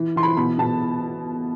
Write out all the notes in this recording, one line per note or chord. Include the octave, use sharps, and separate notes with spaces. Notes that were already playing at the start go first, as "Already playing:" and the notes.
Already playing: E3
E3 C6
B5
B2 B5
B2 A5